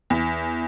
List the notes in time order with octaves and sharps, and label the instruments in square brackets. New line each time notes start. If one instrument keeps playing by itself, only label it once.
[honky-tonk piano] E2